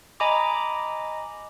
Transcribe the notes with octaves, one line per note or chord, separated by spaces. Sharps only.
D#5 G#5 A#5 B5 D6